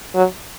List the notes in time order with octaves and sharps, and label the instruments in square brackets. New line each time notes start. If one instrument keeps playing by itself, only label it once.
[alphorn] F#3